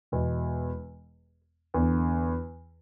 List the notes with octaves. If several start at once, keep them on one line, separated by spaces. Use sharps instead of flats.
E1 E2 B2
E2 D3 B3